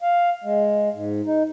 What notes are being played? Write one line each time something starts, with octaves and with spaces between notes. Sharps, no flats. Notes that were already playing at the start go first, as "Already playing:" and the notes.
F5
G#3
G#2
D#4